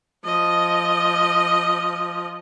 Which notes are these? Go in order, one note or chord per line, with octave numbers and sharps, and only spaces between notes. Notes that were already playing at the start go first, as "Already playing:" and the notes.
F3 D#5